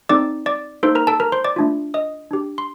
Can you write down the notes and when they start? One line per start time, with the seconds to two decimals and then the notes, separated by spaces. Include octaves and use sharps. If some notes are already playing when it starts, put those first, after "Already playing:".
0.09 C4 D#4 A4 D5 D6
0.46 D5 D6
0.83 A#3 D#4 A4 C5 C6
0.95 A#4 A#5
1.07 A4 A5
1.20 A#4 A#5
1.32 C5 C6
1.44 D5 D6
1.56 A3 D4 F4
1.94 D#5 D#6
2.31 D4 G4
2.58 C6